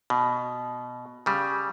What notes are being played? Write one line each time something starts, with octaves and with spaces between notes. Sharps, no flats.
B2
C#3 G3